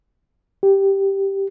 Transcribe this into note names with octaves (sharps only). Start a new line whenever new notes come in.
G4